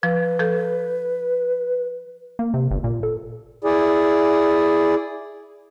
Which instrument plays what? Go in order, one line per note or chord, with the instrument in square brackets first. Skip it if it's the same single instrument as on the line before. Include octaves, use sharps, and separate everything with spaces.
[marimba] F3 [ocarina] B4
[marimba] F3 A4 G6
[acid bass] A#3
C3
G1
A#2
A4
[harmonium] E4 G#4 D5